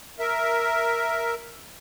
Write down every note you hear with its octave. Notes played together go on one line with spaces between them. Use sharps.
A#4 E5